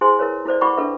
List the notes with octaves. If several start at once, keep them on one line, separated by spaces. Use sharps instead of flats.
E4 G#4 C5 G#5 C6
E4 A#4 B4 C#5
E4 A4 C5 D5
E4 D5 F#5 B5 C#6 D6
D4 A4 B4 E5